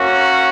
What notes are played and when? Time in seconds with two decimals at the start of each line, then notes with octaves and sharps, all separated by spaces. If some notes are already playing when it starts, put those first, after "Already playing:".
Already playing: A#3 C#4 F#4